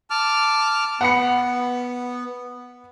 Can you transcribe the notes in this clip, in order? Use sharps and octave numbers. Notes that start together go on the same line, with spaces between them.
A5 D6 F6
B3 F#5 B5 C#7